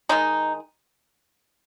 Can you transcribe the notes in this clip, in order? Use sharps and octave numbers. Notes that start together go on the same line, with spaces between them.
D#3 G#3 D#4